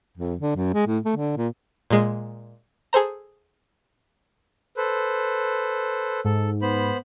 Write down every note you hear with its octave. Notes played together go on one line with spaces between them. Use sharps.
F2
D3
F#2
G#3
A2
A3
D3
A#2
A#2 G#3
G#4 A4 C5 A#5
A4 B4 C5
G#2 A4
B3 C5 B5